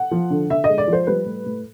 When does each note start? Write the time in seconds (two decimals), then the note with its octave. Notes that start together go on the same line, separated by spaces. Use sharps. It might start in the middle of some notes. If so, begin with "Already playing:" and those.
Already playing: F#5
0.11 F3
0.30 D3
0.50 D3 E5
0.64 D#5
0.69 G#3
0.78 D5
0.88 F3
0.93 C5
1.07 G3 B4
1.26 A2
1.46 A2